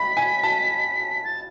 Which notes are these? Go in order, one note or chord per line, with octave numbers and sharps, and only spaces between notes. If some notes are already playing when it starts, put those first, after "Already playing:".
Already playing: B5 B6
G#5
A5
A6